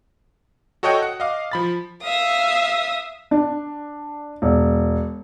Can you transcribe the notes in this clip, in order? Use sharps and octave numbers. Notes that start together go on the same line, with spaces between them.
F#4 A4 C#5 D#5 F#5 G5
F#5
D#5 F5 D6
F3 B5 A6
E5 F5 D#6
D4
E1